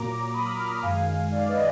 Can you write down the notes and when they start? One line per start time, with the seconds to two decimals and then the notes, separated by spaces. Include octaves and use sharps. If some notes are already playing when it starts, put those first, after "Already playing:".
Already playing: A#2 F#3 A#3 A#5 D6
0.33 B5 D#6
0.45 D6 F6
0.58 D6 F6
0.70 D6 F6
0.82 F#2 D#3 G#3 F5 G#5
1.32 D5 F5
1.48 B4 D#5